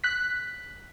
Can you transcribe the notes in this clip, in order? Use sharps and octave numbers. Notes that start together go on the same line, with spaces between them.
F#6 B6